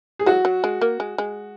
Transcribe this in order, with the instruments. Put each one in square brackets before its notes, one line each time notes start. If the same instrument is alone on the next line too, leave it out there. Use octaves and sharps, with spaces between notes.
[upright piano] G#4
[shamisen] F#3 [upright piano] F#4
[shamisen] F#3
G#3
A#3
G#3
G#3